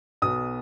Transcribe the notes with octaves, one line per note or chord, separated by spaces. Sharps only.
B1 B2 B3 D#6